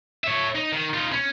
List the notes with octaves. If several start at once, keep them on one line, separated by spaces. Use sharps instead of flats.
C#5 E5
D#4
D#3
D#4 F4
C#4